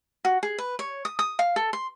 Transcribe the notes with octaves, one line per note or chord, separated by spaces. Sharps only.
F#4
G#4
B4
C#5
D#6
D#6
F5
A4
C6